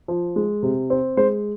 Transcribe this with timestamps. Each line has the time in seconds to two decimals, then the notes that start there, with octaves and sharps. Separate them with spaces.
0.08 F3
0.36 G#3
0.63 C3
0.90 C4
1.17 G#3 C5